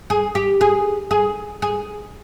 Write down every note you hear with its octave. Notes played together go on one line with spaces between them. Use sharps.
G#4
G4
G#4
G#4
G#4